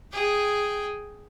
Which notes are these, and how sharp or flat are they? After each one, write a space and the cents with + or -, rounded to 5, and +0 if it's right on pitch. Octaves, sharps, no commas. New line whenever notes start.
G#4 +0 G5 +0